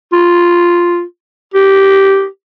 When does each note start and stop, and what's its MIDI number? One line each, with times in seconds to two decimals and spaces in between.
0.13 1.03 65
1.54 2.26 67